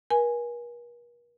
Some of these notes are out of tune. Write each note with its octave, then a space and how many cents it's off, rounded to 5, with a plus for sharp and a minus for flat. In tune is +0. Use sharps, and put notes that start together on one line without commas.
A#4 +45 G#5 +0